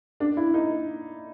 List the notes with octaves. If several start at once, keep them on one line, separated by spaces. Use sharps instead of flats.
D4
E4
D#4